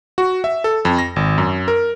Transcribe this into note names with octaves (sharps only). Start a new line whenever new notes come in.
F#4
E5
A4
F2
A#6
G#1
F#2
A#4